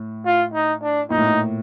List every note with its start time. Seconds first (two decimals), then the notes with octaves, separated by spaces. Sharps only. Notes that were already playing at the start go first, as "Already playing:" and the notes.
Already playing: A2
0.25 F4
0.54 D#4
0.82 D4
1.10 A#2 D#4
1.18 A2
1.27 A#2